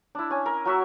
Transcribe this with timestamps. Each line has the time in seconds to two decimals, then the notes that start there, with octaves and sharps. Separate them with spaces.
0.15 D4 E4
0.30 C#4 G#5
0.46 A#4
0.65 F#3 F#4 E5